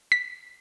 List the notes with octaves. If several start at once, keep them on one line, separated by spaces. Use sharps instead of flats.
B6